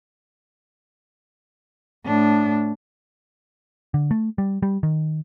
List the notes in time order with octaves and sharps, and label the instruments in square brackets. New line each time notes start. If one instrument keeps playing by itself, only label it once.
[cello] A2 D4
[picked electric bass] D3
A3
G3
G3
D#3